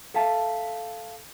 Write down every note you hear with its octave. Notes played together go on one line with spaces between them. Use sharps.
A4 E5 F5 A5